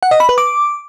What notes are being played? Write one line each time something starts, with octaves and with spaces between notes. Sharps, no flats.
F#5
D#5
B5
B4
D6